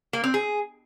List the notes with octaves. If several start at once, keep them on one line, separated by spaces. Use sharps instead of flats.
A#3
C4
G#4